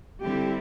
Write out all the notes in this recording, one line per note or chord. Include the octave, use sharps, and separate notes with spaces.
D3 G3 C4 E4 G4